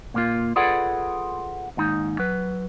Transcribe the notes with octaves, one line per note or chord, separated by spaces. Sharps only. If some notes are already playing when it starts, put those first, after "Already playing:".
A#2 A#3 F4
F4 G#4 A4 B4 D5 F#5
D#2 G#2 D#4
F#3 B4